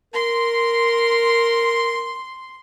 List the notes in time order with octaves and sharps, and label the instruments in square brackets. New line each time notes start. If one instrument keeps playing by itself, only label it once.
[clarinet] A#4 [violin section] C6